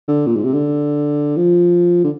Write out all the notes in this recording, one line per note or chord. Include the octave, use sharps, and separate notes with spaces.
D3
A#2
G#2
C3
D3
F3
D3